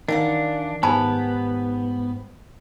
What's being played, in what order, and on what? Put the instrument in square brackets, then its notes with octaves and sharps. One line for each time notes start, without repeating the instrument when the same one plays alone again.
[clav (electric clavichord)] D#3 [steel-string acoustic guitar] E3 F5 F#5 [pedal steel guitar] D4
[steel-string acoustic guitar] G#2 G4 [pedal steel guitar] B3 [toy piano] G#5 A5 B5